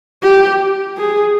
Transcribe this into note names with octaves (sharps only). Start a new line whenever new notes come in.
G4
G#4